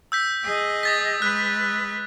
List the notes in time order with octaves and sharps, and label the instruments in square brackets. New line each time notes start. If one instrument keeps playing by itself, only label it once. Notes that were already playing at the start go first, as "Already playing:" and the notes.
[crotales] E6 G6 B6
[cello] G#4 D#5
[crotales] D#6 A6 B6
[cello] G#3 B4 [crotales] F#6